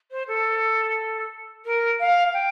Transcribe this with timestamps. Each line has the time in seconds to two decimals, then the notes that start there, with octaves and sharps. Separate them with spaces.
0.11 C5
0.27 A4
1.65 A#4
2.00 F5
2.33 G5